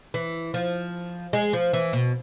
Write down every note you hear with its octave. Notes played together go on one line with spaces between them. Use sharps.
E3
F3
G#3
F3
E3
B2